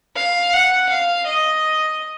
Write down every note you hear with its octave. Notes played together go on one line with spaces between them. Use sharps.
F5
F#5
F5
D#5